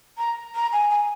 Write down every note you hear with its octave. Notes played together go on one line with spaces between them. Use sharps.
A#5
A#5
G#5
G#5